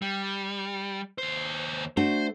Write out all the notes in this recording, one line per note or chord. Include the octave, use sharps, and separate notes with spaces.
G3
D#2 C5
A3 D4 F#4 C5